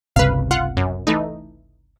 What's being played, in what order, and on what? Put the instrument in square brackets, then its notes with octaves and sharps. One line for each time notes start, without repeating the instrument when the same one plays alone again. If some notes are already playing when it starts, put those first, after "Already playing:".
[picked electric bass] G1 C#2 C3 [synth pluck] B4 F5
[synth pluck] F4 F#5
F#2
E3 A3 D#4